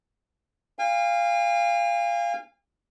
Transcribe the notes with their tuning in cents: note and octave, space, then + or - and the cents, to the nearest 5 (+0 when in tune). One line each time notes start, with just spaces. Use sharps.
F5 -10 G#5 -45